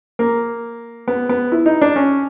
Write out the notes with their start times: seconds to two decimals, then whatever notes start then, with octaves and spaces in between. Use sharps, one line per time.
0.19 A#3
1.08 B3
1.29 B3
1.52 E4
1.66 D#4
1.82 D4
1.96 C#4